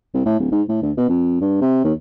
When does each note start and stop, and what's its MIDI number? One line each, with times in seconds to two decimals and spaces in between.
0.14 0.24 36
0.26 0.39 45
0.40 0.51 26
0.52 0.62 44
0.69 0.77 45
0.82 0.92 38
0.97 1.04 47
1.08 1.37 41
1.41 1.58 43
1.61 1.79 48
1.84 1.93 39